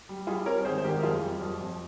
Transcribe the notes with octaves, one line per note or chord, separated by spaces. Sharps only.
G3
G3 F4 G#4
C4 A#4 C#5
G#1 G#4 C5
C5
G#1 G4 A#4
A#4
F2 F4 G#4
G3
F2
F2